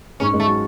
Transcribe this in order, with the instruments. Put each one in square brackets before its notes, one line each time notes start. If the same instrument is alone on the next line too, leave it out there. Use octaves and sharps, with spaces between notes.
[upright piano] G#2 G#3 [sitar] C#4
[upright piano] G#2 G#3
[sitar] A3
[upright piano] F#3